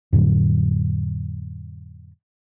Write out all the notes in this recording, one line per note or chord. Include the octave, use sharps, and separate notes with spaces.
F2 A2 D3 F#3